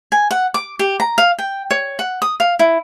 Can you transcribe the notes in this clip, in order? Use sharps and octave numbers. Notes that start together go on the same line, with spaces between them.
G#5
F#5
D6
G4
A#5
F5
G5
C#5
F#5
D#6
F5
E4